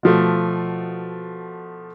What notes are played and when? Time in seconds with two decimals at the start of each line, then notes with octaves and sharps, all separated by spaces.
0.03 B2 F3 A3